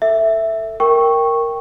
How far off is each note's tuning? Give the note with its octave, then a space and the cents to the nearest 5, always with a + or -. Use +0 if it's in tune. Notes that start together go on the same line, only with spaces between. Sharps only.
A4 +20 E5 +0
A#4 +0 G5 +0 C#6 -10